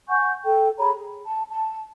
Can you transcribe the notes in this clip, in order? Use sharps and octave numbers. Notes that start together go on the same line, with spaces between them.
F#5 G#5 C#6 G6
A4 G5
G#4 C#5 A#5 B5
G#4
A5
A5